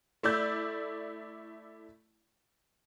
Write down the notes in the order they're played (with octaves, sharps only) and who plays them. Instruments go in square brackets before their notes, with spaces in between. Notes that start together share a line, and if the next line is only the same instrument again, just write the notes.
[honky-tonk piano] A3 E4 D5 G6